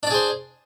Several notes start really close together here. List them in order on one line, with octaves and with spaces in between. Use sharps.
D4 D5 G#4 C5